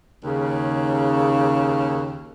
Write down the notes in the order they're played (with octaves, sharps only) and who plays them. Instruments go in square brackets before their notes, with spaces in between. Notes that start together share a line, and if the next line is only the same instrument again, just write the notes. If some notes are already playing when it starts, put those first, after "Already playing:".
[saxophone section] D#2 C#3